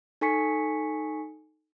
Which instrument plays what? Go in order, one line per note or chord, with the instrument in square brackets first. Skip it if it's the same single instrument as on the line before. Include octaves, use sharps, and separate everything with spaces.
[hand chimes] D#4 A4 G#5 C#6 B6 C#7